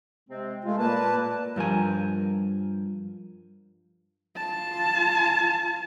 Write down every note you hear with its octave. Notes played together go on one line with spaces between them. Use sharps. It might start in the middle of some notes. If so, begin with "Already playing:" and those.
C3 G#3 C4
G#3 A3 F4
A#2 A#3 B4 A5
G2 F3 A#4 G#5
F4 A5